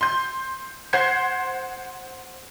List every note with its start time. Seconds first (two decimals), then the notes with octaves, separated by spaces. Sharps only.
0.01 C6 G6
0.93 C5 F#5 C6 G6 G#6 C7